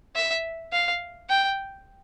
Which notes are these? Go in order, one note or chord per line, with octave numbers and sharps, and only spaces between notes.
E5
F5
G5